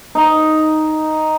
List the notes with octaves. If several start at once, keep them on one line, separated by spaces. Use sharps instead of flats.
D#4